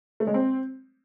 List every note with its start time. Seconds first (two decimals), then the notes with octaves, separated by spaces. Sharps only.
0.20 A3
0.27 G#3
0.34 C4